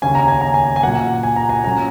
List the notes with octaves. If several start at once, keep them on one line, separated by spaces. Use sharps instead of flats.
D#2 C#3 A#3 C#4 G#5
A#5
G#5
A#5
G#5
G#5
A#2 F#3 A#3 F#5
G#5
A#5
G#5
A#2 F#3 A#3 C#4 A#5